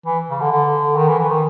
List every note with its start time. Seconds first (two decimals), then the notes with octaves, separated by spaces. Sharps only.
0.06 E3
0.30 C#3
0.41 D3
0.52 D3
0.96 D#3
1.09 E3
1.19 E3
1.31 D#3